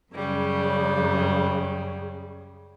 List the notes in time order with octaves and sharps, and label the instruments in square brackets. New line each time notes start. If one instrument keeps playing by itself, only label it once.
[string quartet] F#2 C#3 G3